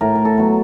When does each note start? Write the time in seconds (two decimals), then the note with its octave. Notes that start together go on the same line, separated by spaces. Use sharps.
0.01 A2 A#4
0.15 A#4
0.25 A4
0.38 F#3 B3